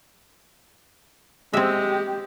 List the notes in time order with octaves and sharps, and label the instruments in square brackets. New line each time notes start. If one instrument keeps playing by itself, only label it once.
[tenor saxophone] G#3 [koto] C4 E5 [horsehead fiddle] G4